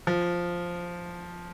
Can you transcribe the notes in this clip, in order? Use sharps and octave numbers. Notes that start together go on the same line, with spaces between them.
F3